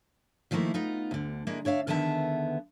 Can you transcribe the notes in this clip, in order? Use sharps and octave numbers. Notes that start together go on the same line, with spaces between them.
D#3 F3 A3 A#3 E4
B3 D#4 F4
D2 D3
G#3 A#3 D4 E4
D4 C#5 E5 F5
E2 D3 D#3 B3 E5 A5